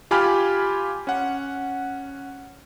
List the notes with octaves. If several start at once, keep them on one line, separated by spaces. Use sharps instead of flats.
F4 G4 G#5 B5 F6
C#4 F#5